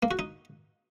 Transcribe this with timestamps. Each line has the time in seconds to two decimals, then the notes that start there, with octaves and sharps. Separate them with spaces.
0.03 A#3
0.11 F#4
0.19 D#4